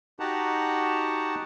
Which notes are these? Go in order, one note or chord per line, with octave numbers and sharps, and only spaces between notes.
D#4 F#4 G4 F#5 A5 A#5